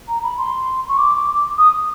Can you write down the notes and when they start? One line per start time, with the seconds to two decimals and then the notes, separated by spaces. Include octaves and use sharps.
0.08 A#5
0.23 B5
0.38 C6
0.88 C#6
0.98 D6
1.58 D#6